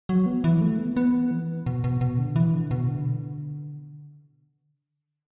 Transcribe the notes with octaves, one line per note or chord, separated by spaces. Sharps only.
F#3
B3
E3
A3
B3
B3
E3
B2
B2
B2
D3
E3
D3
B2
D3